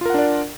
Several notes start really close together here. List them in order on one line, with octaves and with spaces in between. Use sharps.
F4 A#4 F#5 D4 D5